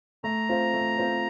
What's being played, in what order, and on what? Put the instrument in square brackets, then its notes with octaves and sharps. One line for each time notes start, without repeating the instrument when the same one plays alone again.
[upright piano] A3 [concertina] A#5
[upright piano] C4 F4 C5
A3
C4 F4 C5